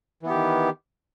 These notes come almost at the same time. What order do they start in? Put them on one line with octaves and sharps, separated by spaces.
E3 B3 G4 D#3